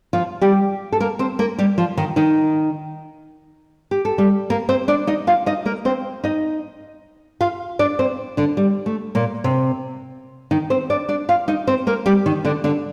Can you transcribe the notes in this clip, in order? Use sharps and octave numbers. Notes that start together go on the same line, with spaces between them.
F3 F4
G3 G4
A4
A#3 A#4
C4 C5
A#3 A#4
G3 G4
F3 F4
D#3 D#4
D#3 D#4
G4
A4
G3 G4
A#3 A#4
C4 C5
D4 D5
D#4 D#5
F4 F5
D#4 D#5
A#3 A#4
C4 C5
D#4 D#5
F4 F5
D4 D5
C4 C5
D3 D4
G3
A3
A#2 A#3
C3 C4
D#3 D#4
C4 C5
D4 D5
D4 D5
F4 F5
D#4 D#5
C4 C5
A#3 A#4
G3 G4
D#3 D#4
D3 D4
D3 D4